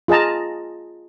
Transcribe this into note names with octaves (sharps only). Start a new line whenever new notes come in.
F4 G#4 D#5 A5 A#5